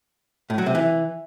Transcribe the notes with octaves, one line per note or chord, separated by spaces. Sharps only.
A2
F#3
C3
E3